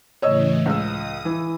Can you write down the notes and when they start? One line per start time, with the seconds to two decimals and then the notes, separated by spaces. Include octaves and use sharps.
0.22 A2 C#3 E3 C#5 D#5 E6
0.66 C#2 D#6 E6
1.25 E3